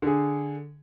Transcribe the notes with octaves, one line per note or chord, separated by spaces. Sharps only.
D3 G#4